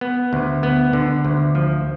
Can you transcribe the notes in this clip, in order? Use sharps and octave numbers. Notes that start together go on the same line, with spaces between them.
B3
D2
B3
D3
D2
F3